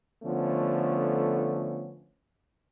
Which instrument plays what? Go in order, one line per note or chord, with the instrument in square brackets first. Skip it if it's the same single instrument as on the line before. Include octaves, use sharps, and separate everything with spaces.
[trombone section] D3 F3 A3 B3 C#4